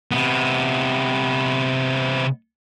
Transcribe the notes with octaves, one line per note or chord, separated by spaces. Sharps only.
C3 B3